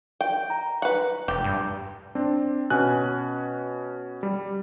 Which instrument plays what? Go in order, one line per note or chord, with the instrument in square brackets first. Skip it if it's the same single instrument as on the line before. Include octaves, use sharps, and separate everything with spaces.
[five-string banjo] G5
[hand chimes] A#5
[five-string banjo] B4 F#5
[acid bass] F1 [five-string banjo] G4
[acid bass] G2
[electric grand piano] C4 D4
B2 C#4 G#5 F#6
G3